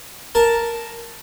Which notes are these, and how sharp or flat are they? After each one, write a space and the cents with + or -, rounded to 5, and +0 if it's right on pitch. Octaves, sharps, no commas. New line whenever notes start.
A#4 +0 A5 +0